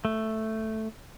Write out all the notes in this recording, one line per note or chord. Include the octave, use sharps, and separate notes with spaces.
A3